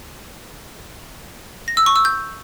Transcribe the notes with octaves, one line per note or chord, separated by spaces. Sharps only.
A#6
E6
C#6
E6
G6